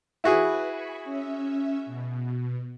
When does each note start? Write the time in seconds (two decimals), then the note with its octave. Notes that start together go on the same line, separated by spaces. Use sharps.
0.24 E4 F#4 G#4 B4
0.70 G#5 B5 C#6
1.04 C#4 E5
1.86 B2